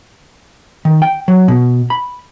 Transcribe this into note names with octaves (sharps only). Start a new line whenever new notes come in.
D#3
G5
F#3
B2
B5